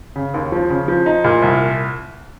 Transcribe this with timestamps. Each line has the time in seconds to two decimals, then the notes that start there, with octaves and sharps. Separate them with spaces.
0.16 C#3
0.34 D#2
0.52 F3
0.70 C#3
0.88 F3
1.06 D#4
1.24 A#2
1.42 C2